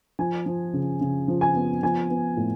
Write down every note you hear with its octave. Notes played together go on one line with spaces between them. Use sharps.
F3 G#5
F3
C#3
C#3
F3
G#5
B3
F3 G#5
B3
A2